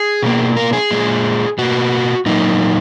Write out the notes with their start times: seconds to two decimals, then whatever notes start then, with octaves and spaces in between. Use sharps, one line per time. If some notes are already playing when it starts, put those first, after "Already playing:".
Already playing: G#4
0.22 B2 A#3
0.57 A#4
0.73 G#4
0.91 A#2 G#3
1.58 B2 A#3 F#4
2.26 A#2 F#3 A#3 D#4